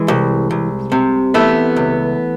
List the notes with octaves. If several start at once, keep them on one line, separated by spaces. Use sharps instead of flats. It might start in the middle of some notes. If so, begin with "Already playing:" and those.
Already playing: E3 G#3
C2
C2
C3
E3 A3 B3
C#2